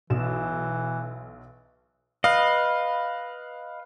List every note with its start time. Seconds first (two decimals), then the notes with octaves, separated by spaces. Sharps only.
0.10 B1 E3 E7
2.24 B4 D#5 F5